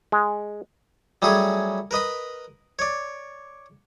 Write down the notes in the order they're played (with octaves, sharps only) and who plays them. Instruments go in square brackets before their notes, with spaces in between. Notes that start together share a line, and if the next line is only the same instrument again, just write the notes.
[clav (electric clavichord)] G#3
[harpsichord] F#3 G3 A3 C#4 G#4
A#4 B4 D#5 B5
C#5 D5